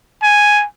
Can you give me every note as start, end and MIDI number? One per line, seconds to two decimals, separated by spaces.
0.22 0.64 80